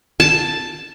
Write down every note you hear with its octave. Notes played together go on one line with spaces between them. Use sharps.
A5